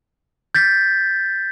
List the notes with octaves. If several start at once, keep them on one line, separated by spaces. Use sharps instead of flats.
G6 A6 B6